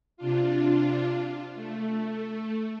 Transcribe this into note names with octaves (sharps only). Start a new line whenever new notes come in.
C3 D4 F4
A3